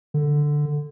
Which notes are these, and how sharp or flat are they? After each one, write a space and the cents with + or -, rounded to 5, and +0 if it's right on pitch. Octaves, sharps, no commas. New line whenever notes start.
D3 +5